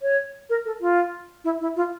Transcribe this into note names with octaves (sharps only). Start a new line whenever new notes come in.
C#5
A#4
A4
F4
E4
E4
F4